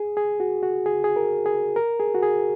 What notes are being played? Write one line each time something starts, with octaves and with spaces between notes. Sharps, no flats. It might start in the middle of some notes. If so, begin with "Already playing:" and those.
Already playing: G#4
G#4
F#4
F#4
G#4
G#4
A#4
G#4
A#4
G#4
F#4
G#4